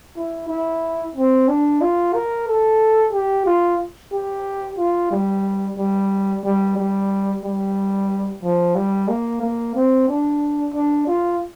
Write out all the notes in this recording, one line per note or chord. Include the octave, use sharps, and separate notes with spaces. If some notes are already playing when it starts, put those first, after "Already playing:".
E4
E4
C4
D4
F4
A#4
A4
G4
F4
G4
F4
G3
G3
G3
G3
G3
F3
G3
A#3
A#3
C4
D4
D4
F4